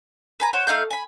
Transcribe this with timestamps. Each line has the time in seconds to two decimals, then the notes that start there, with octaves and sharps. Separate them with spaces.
0.40 B4 G#5 A#5
0.53 F#4 C5 C#5
0.67 A3 D#4 F5 G6
0.90 G#5 B5